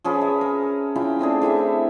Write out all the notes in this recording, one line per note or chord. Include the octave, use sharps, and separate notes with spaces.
F3 C#4 G#4 B4
E5
A#4
C#4 E4 F4 G5
A3 C4 D4 G#4
A3 E4 G4 E5